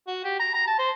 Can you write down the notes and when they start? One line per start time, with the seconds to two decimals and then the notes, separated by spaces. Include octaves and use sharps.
0.08 F#4
0.24 G4
0.40 A#5
0.54 A#5
0.67 A5
0.79 C5